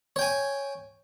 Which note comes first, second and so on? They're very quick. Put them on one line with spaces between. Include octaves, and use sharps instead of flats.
C#5 G5 G#5